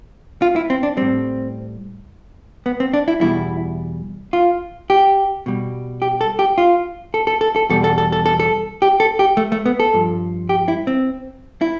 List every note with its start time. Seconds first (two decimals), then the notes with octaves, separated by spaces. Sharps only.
0.42 F4
0.56 E4
0.70 C4
0.83 D4
0.97 A2 G3 C4
2.66 B3
2.80 C4
2.93 D4
3.08 E4
3.21 E2 B2 G3 E4
4.33 F4
4.90 G4
5.46 B2 G3
6.02 G4
6.21 A4
6.39 G4
6.58 F4
7.14 A4
7.27 A4
7.41 A4
7.56 A4
7.69 E2 B2 G3 A4
7.84 A4
7.98 A4
8.12 A4
8.26 A4
8.40 A4
8.82 G4
9.00 A4
9.19 G4
9.37 A3
9.52 A3
9.66 B3
9.80 A4
9.94 G2 F3
10.49 G4
10.68 E4
10.87 C4
11.61 E4